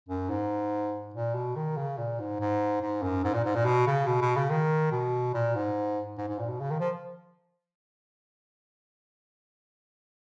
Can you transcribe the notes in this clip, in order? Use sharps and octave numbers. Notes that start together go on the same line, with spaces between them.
F#2
G#2
A#2
B2
D#3
C#3
A#2
G#2
G#2
G#2
F#2
G#2
A#2
G#2
A#2
B2
C#3
B2
B2
C#3
D#3
B2
A#2
G#2
G#2
G#2
A#2
B2
C#3
D#3
F3